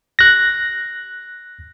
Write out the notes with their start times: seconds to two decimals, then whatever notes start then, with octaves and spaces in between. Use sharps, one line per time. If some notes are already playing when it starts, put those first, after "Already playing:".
0.19 F#6 A#6